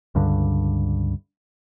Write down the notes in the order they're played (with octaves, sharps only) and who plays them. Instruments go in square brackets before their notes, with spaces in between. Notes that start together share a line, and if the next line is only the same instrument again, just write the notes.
[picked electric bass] C#2 G2 D3